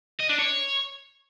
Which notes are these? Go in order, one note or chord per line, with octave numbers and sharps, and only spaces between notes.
D#5
D4
C#5